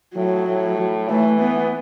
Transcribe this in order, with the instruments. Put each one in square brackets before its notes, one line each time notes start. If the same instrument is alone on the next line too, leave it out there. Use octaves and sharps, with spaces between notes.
[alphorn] A2 [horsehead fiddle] F#3
[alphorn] A2
[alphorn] E3 [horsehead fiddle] A3
[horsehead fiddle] B3